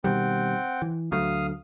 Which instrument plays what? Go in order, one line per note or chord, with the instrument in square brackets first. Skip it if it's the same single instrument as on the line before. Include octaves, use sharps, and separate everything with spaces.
[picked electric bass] B2 D#3 G3 [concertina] C4 F#5 G5
[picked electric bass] E3
[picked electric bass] D2 F#3 A3 [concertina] F5 D#6 F6